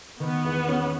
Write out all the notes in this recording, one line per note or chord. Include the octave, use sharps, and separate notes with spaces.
D#3 B3
E2
C#4